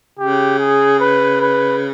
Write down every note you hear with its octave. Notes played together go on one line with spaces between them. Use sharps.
C#3 G4
G#4
B4
B4